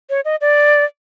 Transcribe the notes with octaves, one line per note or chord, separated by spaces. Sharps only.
C#5
D#5
D5